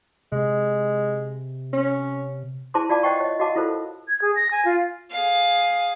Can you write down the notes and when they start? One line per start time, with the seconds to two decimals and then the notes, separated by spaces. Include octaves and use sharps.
0.32 C3 G#3
1.73 C#4
2.74 E4 G#4 C5 A5 C6 D6
2.89 F4 D5 F5 A5 D6
3.03 C5 D#5 F#5 G5 C#6
3.20 C#5 D#5
3.40 F#4 D#5 F5 F#5 A5 D6
3.56 E4 F4 A4 A#4 C5
4.08 G#6
4.22 G#4
4.36 A#6
4.51 G#5
4.65 F4
5.11 G#4 F5